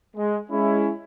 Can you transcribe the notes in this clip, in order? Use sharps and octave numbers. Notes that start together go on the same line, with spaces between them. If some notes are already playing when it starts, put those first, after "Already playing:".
G#3
G#3 C#4 E4